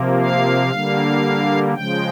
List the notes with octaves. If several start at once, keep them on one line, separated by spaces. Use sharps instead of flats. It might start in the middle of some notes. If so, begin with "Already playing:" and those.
Already playing: C3 F3 A#3
F5
D3 G3 A#3
C#3 F3 G#3 G5